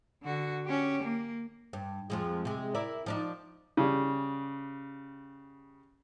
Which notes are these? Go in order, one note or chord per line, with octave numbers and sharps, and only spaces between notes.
D3 F#4
C#4 G4
A#3
G2
F2 F3 G#3
C3 G#3
E4 A#4 D5
F3 D4 D#4
C#3 G3